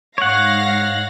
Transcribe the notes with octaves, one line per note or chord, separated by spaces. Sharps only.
G#2 C#5 F5 F#5 A#6